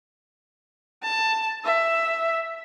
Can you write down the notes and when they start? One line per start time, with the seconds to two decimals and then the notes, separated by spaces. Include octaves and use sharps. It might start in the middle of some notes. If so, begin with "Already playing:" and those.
1.03 A5
1.65 E5